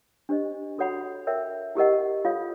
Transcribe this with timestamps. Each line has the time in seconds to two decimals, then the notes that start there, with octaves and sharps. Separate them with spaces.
0.29 D4 G4 C5 D#5
0.78 F#4 A4 C#5 F#5 B5
1.27 A#4 C#5 E5 G5
1.75 E4 G4 A#4 D#5 F#5
2.25 F4 A4 C#5 F5